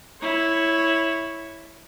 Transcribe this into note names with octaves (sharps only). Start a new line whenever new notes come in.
E4 C#5